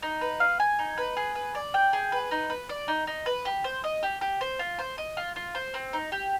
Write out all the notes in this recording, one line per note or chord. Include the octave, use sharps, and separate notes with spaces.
D#4
B4
F5
G#5
D#4
B4
G#4
B4
D5
G5
G#4
B4
D#4
B4
D5
D#4
D#4
B4
G4
C5
D#5
G4
G4
C5
F4
C5
D#5
F4
F4
C5
C4
D#4
G4